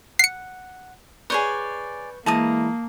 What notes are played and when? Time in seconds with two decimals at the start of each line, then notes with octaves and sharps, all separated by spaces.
0.19 F#5 C7 C#7
1.30 G#4 B4 C#5 D5 C#6 G6
2.26 E3 G#3 A#3 E4 A5 A#5 D#6